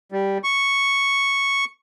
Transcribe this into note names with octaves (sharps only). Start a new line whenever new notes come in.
G3
C#6